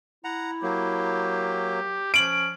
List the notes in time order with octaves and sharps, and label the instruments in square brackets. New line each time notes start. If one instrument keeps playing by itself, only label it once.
[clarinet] E4 [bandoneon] F#5 A#5
[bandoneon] F#3 A#3 [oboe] G4
[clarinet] F3 [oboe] C#4 [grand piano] D7 F#7